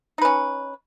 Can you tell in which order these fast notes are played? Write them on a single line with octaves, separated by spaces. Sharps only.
D#4 B4 C#4